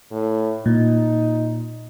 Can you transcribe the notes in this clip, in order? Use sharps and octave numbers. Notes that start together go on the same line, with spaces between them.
A2
A#2 D#4